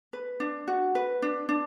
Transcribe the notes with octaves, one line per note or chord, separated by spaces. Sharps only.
B4
D4
F#4
B4
D4
D4